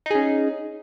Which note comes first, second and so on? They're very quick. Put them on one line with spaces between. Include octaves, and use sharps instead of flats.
D#4 G#4 C#4